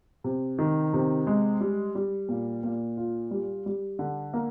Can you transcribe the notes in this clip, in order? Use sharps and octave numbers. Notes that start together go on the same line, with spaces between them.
C3
D#3
C3
G#3
G3
G3
A#2
A#2
F4
G3
G3
D3
A#3